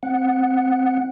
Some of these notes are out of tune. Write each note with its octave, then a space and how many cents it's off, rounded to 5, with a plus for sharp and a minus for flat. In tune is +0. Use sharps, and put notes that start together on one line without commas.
C4 +0 F#5 +0